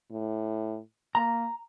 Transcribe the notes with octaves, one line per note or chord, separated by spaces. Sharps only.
A2
A#3 A#5